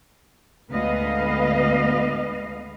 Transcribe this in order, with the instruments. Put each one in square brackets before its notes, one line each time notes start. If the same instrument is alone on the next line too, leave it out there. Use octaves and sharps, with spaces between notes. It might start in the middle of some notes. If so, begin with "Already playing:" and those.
[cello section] D2 G#3 B3 B4 D#5 F5